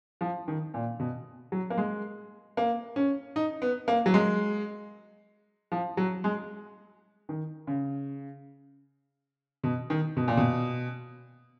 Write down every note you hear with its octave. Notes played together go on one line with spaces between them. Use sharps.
F3
D#3
A#2
B2
F#3
A#3
G#3
A#3
C#4
D#4
B3
A#3
F#3
G#3
F3
F#3
G#3
D#3
C#3
B2
D#3
B2
A#2
B2